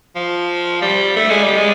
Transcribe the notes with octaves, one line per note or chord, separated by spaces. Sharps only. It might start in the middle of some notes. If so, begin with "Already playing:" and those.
F3
G3
A3
G#3
G3
G#3